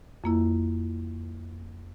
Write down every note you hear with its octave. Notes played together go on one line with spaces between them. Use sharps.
F2 A#3 E4